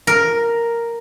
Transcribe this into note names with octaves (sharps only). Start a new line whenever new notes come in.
A#4